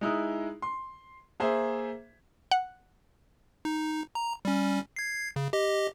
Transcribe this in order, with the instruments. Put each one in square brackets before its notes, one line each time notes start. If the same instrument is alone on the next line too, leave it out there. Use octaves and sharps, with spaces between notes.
[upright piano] G#3 D#4 E4
C6
A#3 G#4 C5 E5
[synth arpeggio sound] F#5
[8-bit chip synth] D#4
A#5
G3 C#4
G#6 C7
C#3
G4 D#5